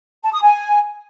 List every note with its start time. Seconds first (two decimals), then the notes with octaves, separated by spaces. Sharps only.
0.23 A5
0.33 D#6
0.42 G#5